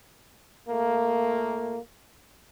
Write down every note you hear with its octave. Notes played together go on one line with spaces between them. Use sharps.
A#2 A3 A#3